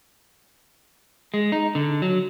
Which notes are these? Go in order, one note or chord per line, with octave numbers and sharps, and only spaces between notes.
G#3
D#4
D3
F#3